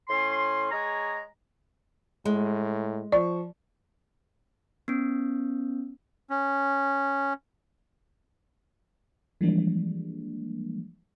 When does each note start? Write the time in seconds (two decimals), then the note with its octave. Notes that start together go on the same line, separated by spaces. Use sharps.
0.09 A2 C#4 C6
0.72 G#3 G#4 C#5 A#5
2.25 A2 G#3
3.12 F3 D5 C#6
4.88 B3 C#4
6.30 C#4
9.41 E3 F3 G3 G#3 A#3 D4